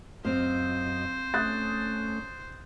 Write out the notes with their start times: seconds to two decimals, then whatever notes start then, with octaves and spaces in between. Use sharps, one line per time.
0.25 F#2 C4 C5 D#5 F5
1.34 A3 C#4 D#6 F#6 A6